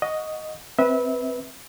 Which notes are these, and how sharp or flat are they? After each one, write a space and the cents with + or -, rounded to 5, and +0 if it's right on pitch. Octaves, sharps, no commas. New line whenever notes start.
D#5 +0 F#5 -25 C#6 +20
C4 +0 B4 -10 E5 -25